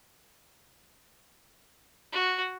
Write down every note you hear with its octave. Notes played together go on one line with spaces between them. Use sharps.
F#4